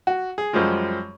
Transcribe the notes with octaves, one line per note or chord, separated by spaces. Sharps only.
F#4
G#4
F#2 F3 G3 G#3 F4